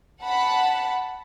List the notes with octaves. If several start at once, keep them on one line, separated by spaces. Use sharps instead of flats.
F#5 A5 B5